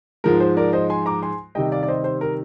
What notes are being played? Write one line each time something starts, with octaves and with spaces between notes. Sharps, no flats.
G#2 F3 G#3 A#4
C5
A#4 D5
C5 D#5
G#5 C6
A#5 D6
G#5 C6
C3 D#3 G3 D#5 G5
D5 F5
D5
C5 D#5
C5
A#4